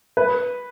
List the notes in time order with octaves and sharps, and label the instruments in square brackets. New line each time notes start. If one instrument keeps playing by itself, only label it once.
[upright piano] B4